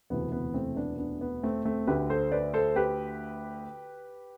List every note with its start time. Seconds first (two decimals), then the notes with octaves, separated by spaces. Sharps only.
0.10 E1 D2 C3 E3 B3
0.32 B3
0.54 A3 C4
0.76 B3 D4
0.98 B3 D4
1.21 B3
1.43 A3 C4
1.65 A3 C4
1.87 D2 D3 G4 B4
2.10 A4 C5
2.32 B4 D5
2.54 A4 C5
2.76 G4 B4